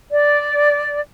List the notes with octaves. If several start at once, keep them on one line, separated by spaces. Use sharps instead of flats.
D5